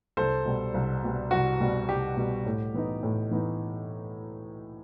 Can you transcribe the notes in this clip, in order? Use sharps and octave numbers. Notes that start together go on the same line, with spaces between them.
C2 A4 C5
B2 G3
C2
B2 G3
C2 F#4
B2 G3
C2 G4
B2 G3
A2
E3 B3 D#4
A2
E3 B3 D#4